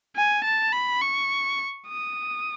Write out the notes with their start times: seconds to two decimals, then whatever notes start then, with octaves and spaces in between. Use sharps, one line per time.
0.16 G#5
0.45 A5
0.73 B5
1.02 C#6
1.89 D#6